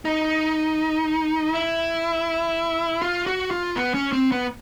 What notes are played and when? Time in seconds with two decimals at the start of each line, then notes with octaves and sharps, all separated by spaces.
0.05 D#4
1.54 E4
3.02 F4
3.26 F#4
3.51 F4
3.76 B3
3.94 C#4
4.13 C4
4.32 B3